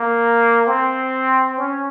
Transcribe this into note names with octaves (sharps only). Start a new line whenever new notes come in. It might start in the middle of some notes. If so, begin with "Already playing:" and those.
Already playing: A#3
C4
C#4